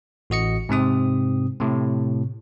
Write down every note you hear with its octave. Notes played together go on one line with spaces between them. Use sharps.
A1 F#4 D#5 C#7
G#2 C3 C4 D#6
A2 C3